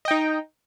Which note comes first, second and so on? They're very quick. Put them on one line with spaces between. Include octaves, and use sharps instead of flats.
D#5 G5 D#4